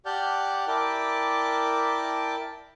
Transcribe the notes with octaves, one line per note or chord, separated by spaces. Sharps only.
G4 D5 F#5 A5 F6 G6
E4 A#4 D5 G5 A5 D6